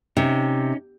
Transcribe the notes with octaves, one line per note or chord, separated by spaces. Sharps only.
C3 C#4 D#4